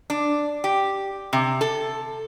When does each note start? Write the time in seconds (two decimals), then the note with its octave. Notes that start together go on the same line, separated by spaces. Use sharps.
0.10 D4
0.64 G4
1.33 C3
1.61 A4